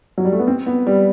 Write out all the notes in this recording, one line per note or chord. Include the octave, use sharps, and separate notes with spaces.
F#3
G3
A3
B3
C4
B3
G3